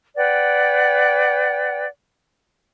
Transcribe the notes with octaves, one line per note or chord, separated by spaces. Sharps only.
B4 D5 F#5 G5